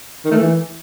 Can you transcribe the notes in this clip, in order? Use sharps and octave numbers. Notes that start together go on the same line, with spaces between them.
D#3
A3
E3